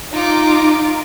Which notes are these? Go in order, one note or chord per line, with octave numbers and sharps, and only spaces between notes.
D#4 F4 D6